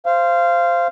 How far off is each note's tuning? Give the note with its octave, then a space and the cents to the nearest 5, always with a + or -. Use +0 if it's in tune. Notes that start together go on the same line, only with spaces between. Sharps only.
C5 -5 F5 -20